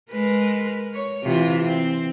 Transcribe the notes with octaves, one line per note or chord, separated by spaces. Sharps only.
G#3 A#4 B4
C#5
C3 E3 F4
C4